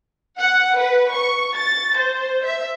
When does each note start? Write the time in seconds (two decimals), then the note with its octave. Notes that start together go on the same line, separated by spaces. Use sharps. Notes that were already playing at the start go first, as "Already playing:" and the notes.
0.38 F#5
0.78 B4
1.13 C#6
1.56 A6
1.97 C5
2.45 E5